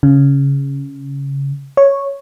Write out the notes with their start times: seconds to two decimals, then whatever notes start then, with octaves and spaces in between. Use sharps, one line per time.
0.03 C#3
1.77 C#5